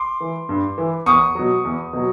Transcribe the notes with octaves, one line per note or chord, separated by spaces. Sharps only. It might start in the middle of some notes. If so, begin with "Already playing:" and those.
Already playing: C6 D6
E3
G2
E3
E2 C#6 D#6
B2 F#3
E2
B2 F#3